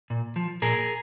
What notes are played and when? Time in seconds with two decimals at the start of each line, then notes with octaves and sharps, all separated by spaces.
0.10 A#2
0.36 F3
0.62 A#2 G#4 A#4